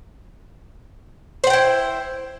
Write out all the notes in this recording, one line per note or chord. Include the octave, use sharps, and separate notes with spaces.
E4 C5 F#5 G5